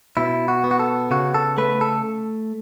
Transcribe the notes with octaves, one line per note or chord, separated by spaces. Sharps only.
B2 E4
F#4
B3
F#4
A4
C#3 F#4
A4
A3 B4
A4